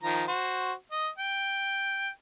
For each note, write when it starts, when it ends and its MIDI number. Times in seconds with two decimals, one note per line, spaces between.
0.03 0.24 51
0.03 0.24 53
0.03 0.24 82
0.28 0.73 66
0.28 0.73 72
0.92 1.08 75
1.18 2.09 79